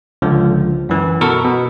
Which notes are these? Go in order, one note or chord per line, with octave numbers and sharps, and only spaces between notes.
C#2 D3 F3
F#2 E3
B2 A4 A#4 C#6
B2